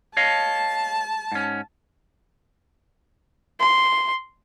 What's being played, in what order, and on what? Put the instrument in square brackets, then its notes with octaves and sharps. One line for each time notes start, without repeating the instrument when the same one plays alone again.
[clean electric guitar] C#5 D#5 F5 [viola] A5
[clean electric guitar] G#2 C#4
[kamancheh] C6